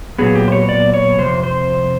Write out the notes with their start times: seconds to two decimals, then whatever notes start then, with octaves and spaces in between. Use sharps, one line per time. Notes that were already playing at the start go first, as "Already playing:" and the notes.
0.18 A#2 F#3 B3 G#4
0.35 G4
0.48 C5
0.52 C#5
0.69 D5
0.94 C#5
1.19 F2 C3 C5
1.43 C5